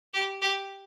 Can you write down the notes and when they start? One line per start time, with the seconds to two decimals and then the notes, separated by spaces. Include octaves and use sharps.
0.14 G4
0.42 G4